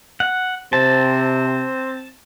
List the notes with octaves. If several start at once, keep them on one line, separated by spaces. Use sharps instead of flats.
F#5
C3 C4 A5